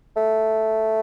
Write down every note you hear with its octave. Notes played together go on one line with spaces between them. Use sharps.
A3